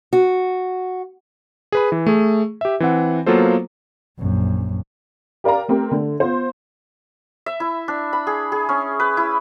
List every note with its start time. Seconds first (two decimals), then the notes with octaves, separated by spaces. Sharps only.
0.13 F#4
1.72 G#4 B4 B5
1.92 E3
2.06 A3 G#4
2.61 G4 E5
2.80 E3 C4 F#5
3.26 F#3 A#3 B3 F4 A4 C5
4.19 A#1 F#2
5.44 G4 A#4 D5 F5 A#5
5.69 A3 C4 G4 A#4
5.91 D3 A3
6.20 B3 F4 C5
7.46 E5
7.60 E4
7.88 D4
8.13 B5
8.27 G#4
8.52 G#4
8.69 C#4
9.00 B4
9.17 E4